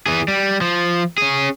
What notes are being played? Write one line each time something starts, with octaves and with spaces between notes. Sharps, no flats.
E3 G#4
G3
F3
C#4 G#4